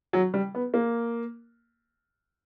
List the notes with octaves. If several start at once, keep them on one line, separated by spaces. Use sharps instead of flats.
F#3
G3
B3
A#3